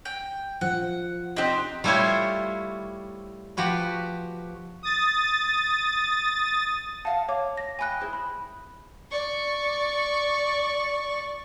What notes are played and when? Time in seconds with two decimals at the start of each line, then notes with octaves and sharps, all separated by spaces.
0.05 G5
0.61 F3 F#5
1.36 C4 D4 D#4 G4
1.84 G3 A3 E4 F4 C5 C#5
3.57 F3 F#4 G4 B4
4.83 D#6 A6
7.05 A#4 F5 F#5 A5
7.29 C#5 F5 D6
7.57 A#6
7.79 D#5 G5 G#5 B5 F#6
8.01 E4 G#4 C5
8.13 B5
9.11 D5 C#6